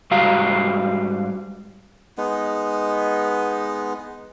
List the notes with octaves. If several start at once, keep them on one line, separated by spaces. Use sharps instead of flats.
G#2 G3 F#4 F5 A#5
G#3 B3 D#4